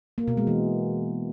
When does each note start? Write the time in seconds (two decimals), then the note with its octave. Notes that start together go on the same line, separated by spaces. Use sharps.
0.18 A#3
0.28 B2
0.37 G#3
0.47 E3